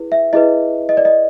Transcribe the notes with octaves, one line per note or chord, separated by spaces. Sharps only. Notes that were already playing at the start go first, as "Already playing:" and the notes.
Already playing: E4 G#4 B4
E5
E4 G#4 B4 D#5
D#5
D5
D#5